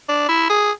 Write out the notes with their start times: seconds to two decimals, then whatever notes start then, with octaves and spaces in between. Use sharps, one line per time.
0.08 D4
0.29 E4
0.49 G#4